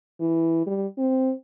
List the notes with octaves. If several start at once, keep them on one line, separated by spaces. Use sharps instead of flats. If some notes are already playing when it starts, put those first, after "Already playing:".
E3
G3
C4